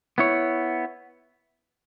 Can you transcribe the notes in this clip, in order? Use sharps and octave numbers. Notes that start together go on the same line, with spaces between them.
B3 E4 C#5